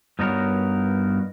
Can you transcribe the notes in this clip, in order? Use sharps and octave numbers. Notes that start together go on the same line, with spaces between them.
G2 B3 D#4 F#4 A#4 C#5